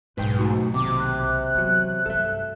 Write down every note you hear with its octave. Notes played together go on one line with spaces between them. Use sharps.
F#1 B1 G#2 B4 G5
A3 D#4 F#4
D#2 C3 D6
F#6
E2 F#3 B3
G2 A3 A4 E5